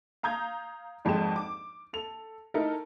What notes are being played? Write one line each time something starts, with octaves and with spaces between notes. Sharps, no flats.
F5 A#5 D#6 G6 G#6
G#1 F2 G#3 G5 E7
D6
A4 F7
A3 D#4 E4 A4 A#4